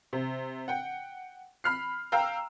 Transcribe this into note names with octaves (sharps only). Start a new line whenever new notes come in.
C3
F#5 G5
B5 F6 C7
F5 G5 A#5 E6